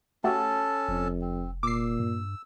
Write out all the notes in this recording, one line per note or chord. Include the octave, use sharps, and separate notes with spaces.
A3 C#4 F#4 G4 A4 A5
F1 F2
C4
A#2 D6 E6 C7
G2